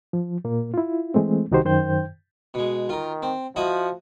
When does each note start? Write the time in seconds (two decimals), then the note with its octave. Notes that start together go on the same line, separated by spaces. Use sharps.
0.13 F3
0.44 A#2 A#3
0.74 E4 F4
1.14 E3 G#3 A3 C4
1.51 C2 D#3 D#4 F#4 G4 C5
1.65 F#2 D#3 C5 G5 G6
2.54 B2 G#3
2.89 D#3 F4 A#4
3.22 C4
3.56 F3 E4 F#4 D#5